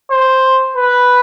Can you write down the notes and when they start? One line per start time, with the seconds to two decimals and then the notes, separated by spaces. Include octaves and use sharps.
0.11 C5
0.76 B4